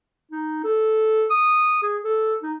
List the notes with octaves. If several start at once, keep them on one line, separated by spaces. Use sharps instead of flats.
D#4
A4
D#6
G#4
A4
D#4